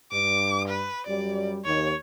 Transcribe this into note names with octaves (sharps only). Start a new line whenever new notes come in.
G2 D6
B4
F#2 G3 D5
D#2 C#5